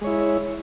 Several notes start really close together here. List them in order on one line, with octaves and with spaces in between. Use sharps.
G#3 C#5 E4